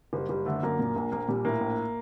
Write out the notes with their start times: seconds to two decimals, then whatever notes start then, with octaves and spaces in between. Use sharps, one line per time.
0.13 F#1 G3
0.29 F#1 G3
0.46 D3 A3
0.63 F#2 A#3
0.79 A#2
0.96 A#1
1.12 A#1 A#3
1.28 A#2 G3
1.45 A2 A#3
1.61 A#1